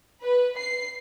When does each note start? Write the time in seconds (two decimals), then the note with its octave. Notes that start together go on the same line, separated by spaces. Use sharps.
0.23 B4
0.57 C7